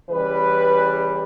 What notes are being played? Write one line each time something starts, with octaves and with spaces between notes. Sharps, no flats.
C#3 E3 G3 B4